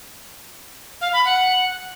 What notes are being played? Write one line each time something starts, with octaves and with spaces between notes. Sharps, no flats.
F5
B5
F#5